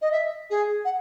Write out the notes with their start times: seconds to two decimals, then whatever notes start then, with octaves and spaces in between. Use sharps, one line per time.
0.02 D#5
0.12 E5
0.50 G#4
0.85 F#5